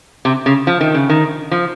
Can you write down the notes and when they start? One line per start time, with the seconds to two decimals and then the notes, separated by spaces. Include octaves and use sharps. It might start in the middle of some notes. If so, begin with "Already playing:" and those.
0.25 C3
0.46 C#3
0.67 F3
0.81 D#3
0.94 C#3
1.09 D#3
1.51 F3